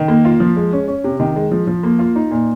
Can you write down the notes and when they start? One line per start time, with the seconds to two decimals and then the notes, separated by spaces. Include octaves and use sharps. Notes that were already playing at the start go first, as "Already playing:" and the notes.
Already playing: D#3
0.08 A#3
0.25 F4
0.40 F3
0.56 G#3
0.73 C#4
0.88 C#4
1.04 C3
1.20 D#3
1.36 G#3
1.51 F3
1.67 F3
1.83 A#3
1.99 F4
2.16 D#4
2.31 A#2